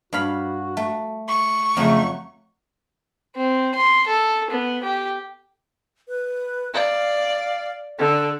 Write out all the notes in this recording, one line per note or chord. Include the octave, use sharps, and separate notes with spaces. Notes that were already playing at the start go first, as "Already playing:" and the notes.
G2 F#4 F5 B5
A3
C#6
F2 C#3 F#3 A3
C4
C6
A4
B3
G4
B4
D5 F5
D3 A4